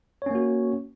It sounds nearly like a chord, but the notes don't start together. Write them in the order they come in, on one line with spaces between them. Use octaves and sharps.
C#5 C#4 A#3 F#4